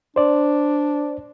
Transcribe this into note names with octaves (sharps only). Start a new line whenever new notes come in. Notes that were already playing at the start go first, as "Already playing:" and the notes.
D4 C5 D5